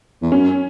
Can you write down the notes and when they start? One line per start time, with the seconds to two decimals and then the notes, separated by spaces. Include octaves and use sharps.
0.22 E2
0.32 F#2 C#4